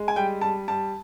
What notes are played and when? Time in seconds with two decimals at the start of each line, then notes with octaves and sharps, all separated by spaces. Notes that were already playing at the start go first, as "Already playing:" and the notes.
Already playing: G#3
0.08 G#5
0.16 G3 G5
0.41 G3 A5
0.68 G3 A5